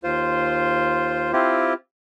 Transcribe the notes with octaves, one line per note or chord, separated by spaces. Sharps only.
D#2 F4 C5
C4 E4 F4 G4